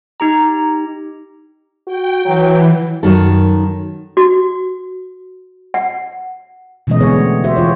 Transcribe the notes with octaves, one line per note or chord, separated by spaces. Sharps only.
D#4 G4 A#5
F#4 G5
E3 F#3
F#2 D#3 F#4 A4
F#4
F#5
B2 D3 E3 G#3 C#4 D#5
D3 B3 C4 G#4 C#5
A3
F#4 G4 C5 E5
E3 F4 C#5